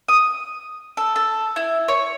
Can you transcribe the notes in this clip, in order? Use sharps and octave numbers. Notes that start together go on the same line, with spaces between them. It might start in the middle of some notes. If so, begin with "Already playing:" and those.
D#6
A4
A4
E4
C#5